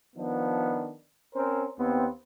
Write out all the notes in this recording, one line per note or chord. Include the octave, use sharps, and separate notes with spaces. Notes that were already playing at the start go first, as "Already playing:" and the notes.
D#3 F3 B3 D4
C4 C#4 A#4 C5
D#2 B3 C4